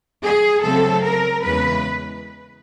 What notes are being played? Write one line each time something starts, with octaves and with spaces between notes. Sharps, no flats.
G#4
C#3 F#3 A3 C4 A4
A#4
E2 C#3 E3 G#3 C#4 B4